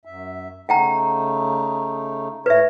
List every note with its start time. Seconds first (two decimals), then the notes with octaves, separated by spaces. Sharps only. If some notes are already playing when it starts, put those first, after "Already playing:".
0.05 F#2 E5
0.69 C#3 A3 D#4 F#5 G5 A#5
2.46 A2 B4 C#5 E5